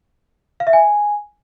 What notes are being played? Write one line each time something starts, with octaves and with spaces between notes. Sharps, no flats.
F5
E5
G#5